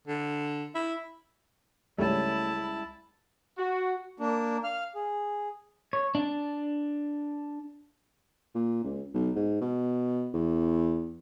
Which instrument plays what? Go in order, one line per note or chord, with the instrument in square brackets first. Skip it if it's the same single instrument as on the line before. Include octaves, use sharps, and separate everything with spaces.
[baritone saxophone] D3
E4
[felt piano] C#2 G3 E5 [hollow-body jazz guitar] A3 [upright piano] C#4 [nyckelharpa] E4 A5
[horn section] F#4
[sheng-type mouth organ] A#3 D4
F5 F6
G#4
[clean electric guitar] C#5
D4
[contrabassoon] A#2
C#2
B1
G#2
B2
E2